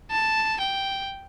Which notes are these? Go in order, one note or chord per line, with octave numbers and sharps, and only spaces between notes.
A5
G5